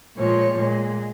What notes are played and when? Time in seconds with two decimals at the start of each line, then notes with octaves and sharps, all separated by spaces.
0.17 A#2 F3 G#3 C#5
0.57 A#2 G#3